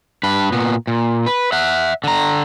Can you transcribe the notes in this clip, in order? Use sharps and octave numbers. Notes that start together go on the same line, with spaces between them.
G2 B4
A#2 B3
A#2
B4
E5 F#5
D3 A#5